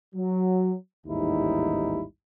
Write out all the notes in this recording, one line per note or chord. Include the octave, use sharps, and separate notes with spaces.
F#3
A1 D#2 G#2 G3 D#4 E4